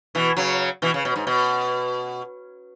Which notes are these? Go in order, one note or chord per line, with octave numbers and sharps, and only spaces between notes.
B2 E3
C#3 F#3
B2 E3
C#3
B2
G#2
B2